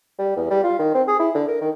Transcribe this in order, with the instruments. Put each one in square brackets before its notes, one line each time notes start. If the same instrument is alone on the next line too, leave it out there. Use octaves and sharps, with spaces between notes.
[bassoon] G3
E2
G3
F4
D#3
C4
G#4
E4
D3
A#4
D#3